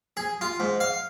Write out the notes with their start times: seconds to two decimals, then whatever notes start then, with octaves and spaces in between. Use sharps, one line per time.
0.17 G#4
0.41 F4
0.60 G#2
0.80 F5